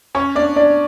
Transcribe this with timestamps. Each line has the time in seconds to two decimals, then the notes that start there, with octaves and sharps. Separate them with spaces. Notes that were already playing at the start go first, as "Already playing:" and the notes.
0.15 C#4 C#5
0.35 D4 D5
0.56 D4 D5